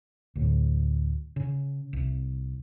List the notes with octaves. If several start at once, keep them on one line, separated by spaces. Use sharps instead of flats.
D2 A2
C#3
C2